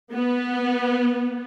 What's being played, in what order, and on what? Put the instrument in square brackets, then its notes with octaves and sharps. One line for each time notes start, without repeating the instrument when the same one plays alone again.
[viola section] B3